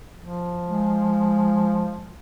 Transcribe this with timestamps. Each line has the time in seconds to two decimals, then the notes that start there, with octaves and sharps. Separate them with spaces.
0.20 F3
0.67 G#3